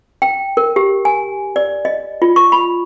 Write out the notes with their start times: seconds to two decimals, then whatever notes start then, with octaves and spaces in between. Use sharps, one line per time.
0.22 G5
0.57 A#4
0.76 G4
1.05 G#5
1.56 D5
1.85 D#5
2.22 F4
2.36 C#6
2.52 B5